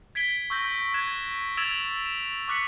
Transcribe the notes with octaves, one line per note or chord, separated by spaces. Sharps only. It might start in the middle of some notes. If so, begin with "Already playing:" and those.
G#6 B6 D7 G7
C#6 E6 G6 A#6
F#6 G#6 E7
E6 G#6 A6 D7 E7 F7
E7
C#6 D6 F#6 B6 C#7 F#7